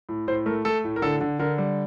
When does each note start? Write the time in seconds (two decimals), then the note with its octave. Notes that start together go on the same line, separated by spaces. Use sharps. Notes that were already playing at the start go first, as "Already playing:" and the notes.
0.09 A2
0.27 A2 C5
0.46 A3 A#4
0.65 A3 A4
0.84 A2
0.96 A#4
1.02 D3 A4
1.21 D3
1.39 D3 A#4
1.58 G3